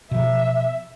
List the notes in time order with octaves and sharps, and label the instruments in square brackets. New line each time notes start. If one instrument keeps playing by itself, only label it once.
[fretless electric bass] B2 F3 [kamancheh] E5